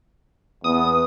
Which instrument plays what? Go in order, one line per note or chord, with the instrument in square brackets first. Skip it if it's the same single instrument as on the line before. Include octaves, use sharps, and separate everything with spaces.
[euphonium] E2 [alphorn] B3 [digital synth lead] D#6